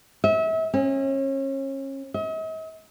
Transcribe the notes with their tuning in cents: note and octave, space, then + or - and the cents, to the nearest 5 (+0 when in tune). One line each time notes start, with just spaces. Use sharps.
E5 -35
C#4 -35
D#5 +45